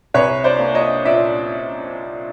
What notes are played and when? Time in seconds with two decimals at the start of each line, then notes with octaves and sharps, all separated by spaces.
0.14 C2 B4 C#5
0.44 C5 D5
0.59 A#3
0.75 C#5 D#5
1.05 A#2 D5 E5